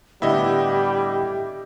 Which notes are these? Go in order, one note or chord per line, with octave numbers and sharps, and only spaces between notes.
A2 D3 G3 B3 E4 G4 D#5